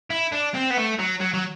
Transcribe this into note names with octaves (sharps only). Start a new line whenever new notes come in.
E4
D4
C4
B3
A3
F#3
F#3
F#3